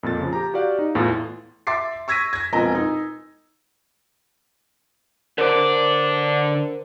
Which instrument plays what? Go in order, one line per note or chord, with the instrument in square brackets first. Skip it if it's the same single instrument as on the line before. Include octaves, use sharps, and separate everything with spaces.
[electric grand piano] F2 A#2 A4 A6
C#3 F3
G4 A#5
F#4 G4 D5 F5
D#4
E2 A2 F4 A6
[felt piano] E5 C6 D6 A6 C7
C#6 E6 G#6 A#6 B6 D#7
G#6 A#6
E1 A#1 B3 C4 D#5 A#5
D#4
[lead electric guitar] D3 D5 [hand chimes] A#4 C5